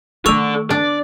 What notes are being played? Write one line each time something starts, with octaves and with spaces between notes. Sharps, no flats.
D#3 A3 A4 D5 C#6 E6 F7
D4 D5